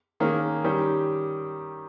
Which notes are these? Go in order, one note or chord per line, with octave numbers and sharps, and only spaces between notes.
D#3 A#3 C#4 G#4
D#3 G3 C#4 G4